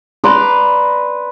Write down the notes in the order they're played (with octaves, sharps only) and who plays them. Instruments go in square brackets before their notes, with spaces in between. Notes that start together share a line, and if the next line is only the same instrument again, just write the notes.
[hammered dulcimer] B4 D5 A#5 C6